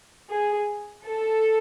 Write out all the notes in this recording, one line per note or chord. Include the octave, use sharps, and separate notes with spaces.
G#4
A4